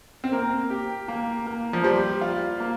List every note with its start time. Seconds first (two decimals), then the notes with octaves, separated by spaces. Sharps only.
0.24 C4
0.32 A#3 A#4
0.70 G4
1.08 A#3
1.47 A#3
1.73 F3
1.83 G3 C5
2.21 F4
2.60 A#3